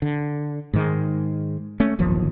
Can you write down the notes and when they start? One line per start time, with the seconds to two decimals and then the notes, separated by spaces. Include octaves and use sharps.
0.02 D3
0.73 G#2 D#3 G#3
1.80 A3 C#4
1.99 D1 G1 D#2 F3